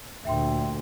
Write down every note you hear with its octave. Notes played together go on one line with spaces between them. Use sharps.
D2 A#2 E5 G5 C6